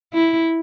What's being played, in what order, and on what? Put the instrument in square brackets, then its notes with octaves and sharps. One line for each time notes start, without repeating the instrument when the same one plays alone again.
[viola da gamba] E4